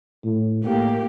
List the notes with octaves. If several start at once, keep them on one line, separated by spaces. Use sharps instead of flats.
A2
A2 A#3 G4